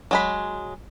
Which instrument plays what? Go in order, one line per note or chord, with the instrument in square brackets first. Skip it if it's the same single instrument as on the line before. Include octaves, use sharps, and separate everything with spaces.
[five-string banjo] F#3 G#3 B5